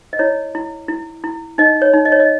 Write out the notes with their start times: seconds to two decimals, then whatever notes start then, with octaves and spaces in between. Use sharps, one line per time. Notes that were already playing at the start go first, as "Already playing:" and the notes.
0.13 D#5
0.19 E4 C#5
0.55 E4
0.88 E4
1.24 E4
1.58 D#4 D#5
1.82 C#5
1.93 D#4
2.05 D#5
2.12 C#5
2.20 D#5